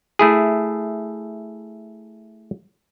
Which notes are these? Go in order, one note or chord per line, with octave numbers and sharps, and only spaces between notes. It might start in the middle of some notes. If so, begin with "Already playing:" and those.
A3 E4 G#4